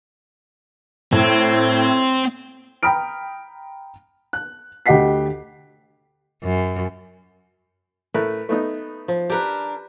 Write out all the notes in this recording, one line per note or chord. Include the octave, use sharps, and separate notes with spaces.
A2 C4
G5 A#5 B5 D#6 F6 D7
F#6
D2 G4 D#5 F#5 B6 C7
F#2
A2 A3 A#4 B4
A3 B3 D#4
F3
D4 G4 A#4 B4